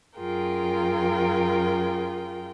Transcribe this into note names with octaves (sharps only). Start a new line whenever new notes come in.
F#2 F4 G#4 A#4 G5